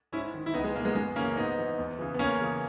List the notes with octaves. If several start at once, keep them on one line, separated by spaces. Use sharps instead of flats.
G#2 C#4 E4
D#3
E4
C#2 B3 D#4
G#3
B2 A#3
G#3 B3
F#2 G#3 B3
C#3 E3 A#3 C#4
G#2 B3 D#4
E3
E2
C#3 E3
B3
E2 A#3 C#4
C#3 E3